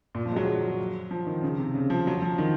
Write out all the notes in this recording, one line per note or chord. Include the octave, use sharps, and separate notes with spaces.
A#2
F3
G#3
F#3
F3
D#3
C#3
C3
C#3
F3
F#3
F3
D#3